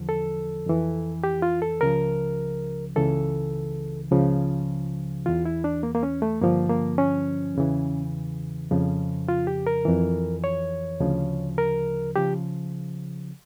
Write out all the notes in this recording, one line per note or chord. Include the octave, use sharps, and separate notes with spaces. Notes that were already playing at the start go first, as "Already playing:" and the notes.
Already playing: E2 D3 F3
A4
F2 E3
G4
F4
A4
C#2 C#3 F3 A#4
C#2 C#3 E3 A4
C#2 C#3 F3
E2 E3 F4
E4
D4
A#3
A#3
C#4
A3
G2 D3 F3 A#3
A#3
C#4
E2 C#3 E3
F2 C#3 F3
F4
G4
A#4
F2 E3
C#5
D2 C#3 F3
A#4
C#3 F3 G4